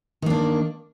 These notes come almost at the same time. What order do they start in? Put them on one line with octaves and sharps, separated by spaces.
D#3 A#3 D4